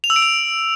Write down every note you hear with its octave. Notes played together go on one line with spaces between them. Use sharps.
F7
E6
D7
F7